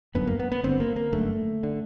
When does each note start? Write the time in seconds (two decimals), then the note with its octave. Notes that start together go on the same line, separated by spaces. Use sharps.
0.15 G1 F#2 D3 B3
0.27 A#3
0.39 B3
0.52 B3
0.63 G1 F#2 D3 C4
0.80 A#3
0.96 A#3
1.12 G1 F#2 D3 A3
1.63 D3